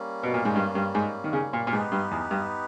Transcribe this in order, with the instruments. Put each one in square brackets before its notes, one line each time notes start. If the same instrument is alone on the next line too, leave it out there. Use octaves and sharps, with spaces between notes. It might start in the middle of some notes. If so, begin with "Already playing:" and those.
Already playing: [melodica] G3 A#3 C#4
[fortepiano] B2
A#2
G#2
G2
G2
G#2
D#3
C#3
A#2
A#2
[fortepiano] G#2 [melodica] B3 D#4 G4 B4
[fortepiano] G2
E2
G2